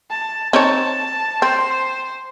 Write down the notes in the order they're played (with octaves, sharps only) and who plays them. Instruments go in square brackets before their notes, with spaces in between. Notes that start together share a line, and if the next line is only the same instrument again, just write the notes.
[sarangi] A5
[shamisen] C4 D#4 C#5 [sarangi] A5
[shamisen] C4 [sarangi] C5